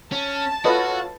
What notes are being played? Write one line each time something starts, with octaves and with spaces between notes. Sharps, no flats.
C#4 A5
F4 F#4 A4 B4 C#5 D#5